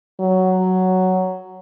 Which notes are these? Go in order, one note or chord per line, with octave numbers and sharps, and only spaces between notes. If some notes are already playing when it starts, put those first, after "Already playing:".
F#3